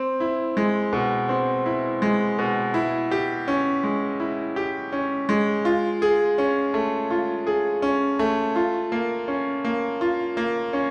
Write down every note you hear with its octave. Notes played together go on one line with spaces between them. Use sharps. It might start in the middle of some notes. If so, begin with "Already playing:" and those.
Already playing: C4
E4
G#3
B2
C4
E4
G#3
B2
E4
G4
C#4
G#3
E4
G4
C#4
G#3
F4
G#4
C#4
A3
F4
G#4
C#4
A3
F4
A#3
C#4
A#3
F4
A#3
C#4